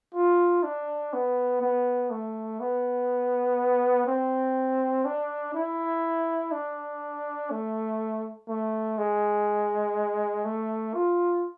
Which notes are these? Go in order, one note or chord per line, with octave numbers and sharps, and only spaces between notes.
F4
D4
B3
B3
A3
B3
C4
D4
E4
D4
A3
A3
G#3
A3
F4